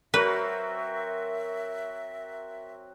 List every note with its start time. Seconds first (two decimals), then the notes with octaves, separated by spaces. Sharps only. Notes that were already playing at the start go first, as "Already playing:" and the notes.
0.14 F#3 C4 F#4 A#4 B4 E5